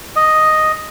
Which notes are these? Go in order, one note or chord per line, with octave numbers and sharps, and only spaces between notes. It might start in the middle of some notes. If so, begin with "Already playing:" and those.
D#5